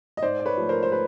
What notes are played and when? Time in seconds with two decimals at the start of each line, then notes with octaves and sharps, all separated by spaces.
0.17 D#5
0.22 G#2 C5 D5
0.39 D5
0.45 B4 C#5
0.57 F3 A3
0.69 A#4 C5
0.83 C5
0.92 B4